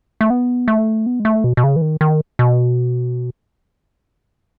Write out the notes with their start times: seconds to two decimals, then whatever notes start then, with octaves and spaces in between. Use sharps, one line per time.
0.21 A3
0.30 B3
0.68 A3
1.06 B3
1.20 G#3
1.25 A3
1.44 B2
1.57 B2
1.64 C#3
1.76 E3
1.82 D#3
2.01 D#3
2.39 B2